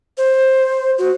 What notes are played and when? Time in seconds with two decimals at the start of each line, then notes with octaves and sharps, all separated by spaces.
0.18 C5
0.98 F#4